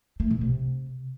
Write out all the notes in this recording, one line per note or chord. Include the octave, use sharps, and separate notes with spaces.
A3
B2
C3